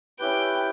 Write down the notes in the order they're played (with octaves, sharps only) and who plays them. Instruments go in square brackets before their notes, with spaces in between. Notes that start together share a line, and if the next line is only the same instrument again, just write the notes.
[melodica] C#4 E4 G4 B4 [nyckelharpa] G5